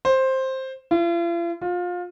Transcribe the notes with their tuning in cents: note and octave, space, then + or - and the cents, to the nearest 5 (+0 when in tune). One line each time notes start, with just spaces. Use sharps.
C5 +10
F4 -45
F4 +25